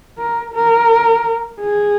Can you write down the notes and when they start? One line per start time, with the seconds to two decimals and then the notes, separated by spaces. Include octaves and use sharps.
0.18 A#4
0.54 A#4
1.61 G#4